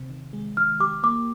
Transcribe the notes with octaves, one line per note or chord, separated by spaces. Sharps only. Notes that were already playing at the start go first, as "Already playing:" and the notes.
Already playing: C3
D#3
G#3
D#3 F6
G4 D6
A#3 D6